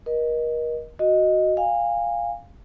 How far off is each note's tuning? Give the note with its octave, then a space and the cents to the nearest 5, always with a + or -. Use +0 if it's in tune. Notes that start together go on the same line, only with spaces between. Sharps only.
A#4 +35 D#5 +0
F#4 +0 D#5 +0
F5 +0 G#5 -30